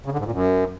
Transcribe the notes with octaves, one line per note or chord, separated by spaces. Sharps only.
C#3
D3
G#2
A#2
F#2